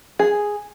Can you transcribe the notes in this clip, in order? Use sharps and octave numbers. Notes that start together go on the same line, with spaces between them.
G#4